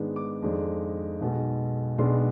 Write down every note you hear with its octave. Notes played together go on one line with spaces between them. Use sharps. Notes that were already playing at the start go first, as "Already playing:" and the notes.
Already playing: G#2 D#3 G#3 B3 D4
D6
F2 D#3 G#3 D4
B1 B2 G#3
B1 B2 G#3 B3 D4 C6